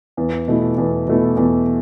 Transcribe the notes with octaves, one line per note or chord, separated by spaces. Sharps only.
E2
B2 A3 E4
E2
B2 A3 E4
E2